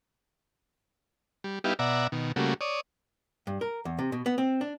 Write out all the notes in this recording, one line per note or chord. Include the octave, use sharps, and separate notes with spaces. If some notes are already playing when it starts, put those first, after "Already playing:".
G3
G3 B3 D#4 E4 G4 F5
B2 D5 E5 F#5 A#5
B2 D#3
C#3 G3 A3 A#3 F#4
C#5 D5 D#6
G2
A#4
E2
C3
B2
B3
C4
D4